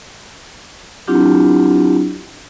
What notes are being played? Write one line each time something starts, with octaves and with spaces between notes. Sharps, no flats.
F#3 C4 D4 E4 F4 G4